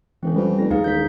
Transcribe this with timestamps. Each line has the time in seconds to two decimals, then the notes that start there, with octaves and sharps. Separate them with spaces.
0.23 E1 E3 C4 C#4
0.36 F2 G3 B4
0.59 F1 A#6
0.71 D#2 D#4 G#4 F5
0.84 E1 G6 B6